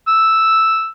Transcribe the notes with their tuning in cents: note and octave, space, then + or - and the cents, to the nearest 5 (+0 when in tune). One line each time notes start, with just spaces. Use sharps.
E6 +0